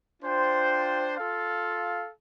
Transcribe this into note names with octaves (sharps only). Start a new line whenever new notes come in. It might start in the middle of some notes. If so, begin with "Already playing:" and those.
D4 F4 C5 G5
F4 A4 F5